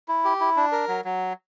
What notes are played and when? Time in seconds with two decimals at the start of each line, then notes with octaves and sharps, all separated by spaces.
0.08 E4
0.25 G4
0.40 E4
0.57 D4
0.72 A#4
0.88 F#3
1.05 F#3